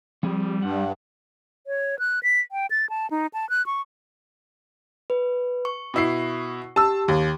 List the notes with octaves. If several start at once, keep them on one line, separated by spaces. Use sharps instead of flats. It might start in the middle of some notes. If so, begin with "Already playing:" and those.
F3 G3 C4 G#4
G2 F#5
C#5
F#6
B6
G5
A6
A5
D#4
A5
F#6
C#6
B4
C#6
B2 E4 C7
G4 A5 E6
D#2